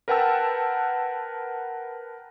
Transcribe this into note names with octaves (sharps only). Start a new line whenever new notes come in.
A#4 B4 F#5 G5 A5 E6